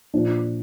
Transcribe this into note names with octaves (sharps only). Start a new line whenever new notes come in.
A#2 F3 D4